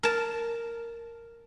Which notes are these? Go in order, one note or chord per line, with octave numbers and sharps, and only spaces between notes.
A#4 A5